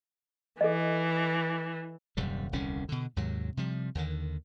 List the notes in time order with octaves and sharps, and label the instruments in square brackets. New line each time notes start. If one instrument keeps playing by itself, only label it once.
[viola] E3 [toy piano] A4 D#5
[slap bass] D#1 F#2 C3 G3
D#1 C2 D3 C#4
B2 D3
D#2 G#2 C3 F#3
C3 F3 G3
D#2 D3 D#3